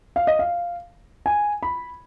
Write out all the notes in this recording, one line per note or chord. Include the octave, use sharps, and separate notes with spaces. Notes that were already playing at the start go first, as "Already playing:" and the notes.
F5
D#5
F5
G#5
B5